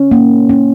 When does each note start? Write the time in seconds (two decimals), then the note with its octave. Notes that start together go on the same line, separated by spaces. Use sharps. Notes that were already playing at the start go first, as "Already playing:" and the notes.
Already playing: C#4
0.11 A#3
0.49 C#4